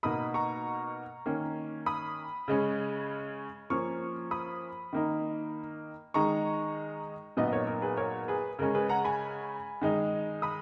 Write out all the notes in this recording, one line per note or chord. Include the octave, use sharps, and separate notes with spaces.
B2 A#3 D#4 B5 D#6
A#5 C#6
D#3 A#3 C#4
B5 D#6
C#3 G#3 C#4
F3 A#3 C#4 C#6 F6
B5 D#6
D#3 A#3 D#4
D#3 G#3 D#4 A#5 C#6
A#2 F#3 B3 D#4 B4 D#5
D#5
A#4 C#5
A#4
G#4 B4
A#4 C#5
G#4 B4
C#3 G#3 C#4 A#4
G#4 B4
F#5 A#5
G#5 B5
D#3 G#3 D#4
B5 D#6